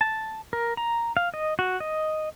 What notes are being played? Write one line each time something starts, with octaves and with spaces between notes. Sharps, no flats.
A5
A#4
A#5
F5
D#5
F#4
D#5